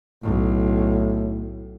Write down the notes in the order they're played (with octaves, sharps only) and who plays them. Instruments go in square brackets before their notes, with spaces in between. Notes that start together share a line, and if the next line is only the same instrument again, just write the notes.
[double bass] B1 [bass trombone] A2